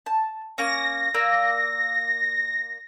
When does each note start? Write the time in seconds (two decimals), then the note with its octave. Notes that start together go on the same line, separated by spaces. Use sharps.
0.06 A5
0.58 A#3 C#4 A#6
1.14 A#3 D5 E6